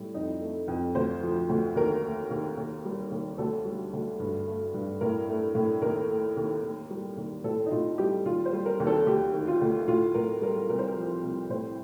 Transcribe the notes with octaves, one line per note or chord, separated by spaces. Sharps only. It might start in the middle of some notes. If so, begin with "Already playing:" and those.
Already playing: A2 G3
F2 D#4
A3
F2
D2 C5
F3
D2
D#2 A#4
A3
D#2
D#2
G3
D#2
D2 A4
G3
D2
G2
A3
G2
A2 A#4
A3
A2
D#2 A#4
A3
D#2
D#2
G3
D#2
A2 A4
D#4
A2 F4
G3 G4
D#2 F4
C5
G3
A#4
D#2
A4
D2 G4
D#3
F4
D2
A2 F4
A2 A#4
G3 A#4
C2 A#4
C5
A#4
F3
C2
A2 C5